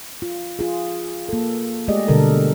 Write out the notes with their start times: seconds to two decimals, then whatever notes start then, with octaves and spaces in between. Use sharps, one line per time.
0.22 F4
0.59 F4 G#4
1.29 A#3 A4
1.88 G#3 A3 G4 G#4 D5 D#5
2.08 B2 D3 G3 A4 A#4